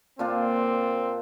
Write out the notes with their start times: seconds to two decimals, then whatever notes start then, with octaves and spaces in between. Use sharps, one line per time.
0.19 A#2 C4 D4 F4